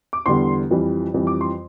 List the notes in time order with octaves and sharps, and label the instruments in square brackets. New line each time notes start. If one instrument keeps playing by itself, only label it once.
[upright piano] D6
E2 D3 G3 C6
F2 E3 G3
F2 E3 G3
D6
C6